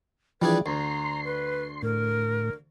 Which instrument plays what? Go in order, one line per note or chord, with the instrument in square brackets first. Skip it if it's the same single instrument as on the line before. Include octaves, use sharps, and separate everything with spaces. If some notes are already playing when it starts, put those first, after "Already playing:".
[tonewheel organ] E3 F3 [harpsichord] G3 D4 G#4 [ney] B4
[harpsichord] D2 [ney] A#5 [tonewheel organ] C6
[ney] B4
[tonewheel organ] A2 [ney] A#4